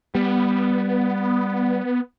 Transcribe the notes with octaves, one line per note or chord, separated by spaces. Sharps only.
G3 B3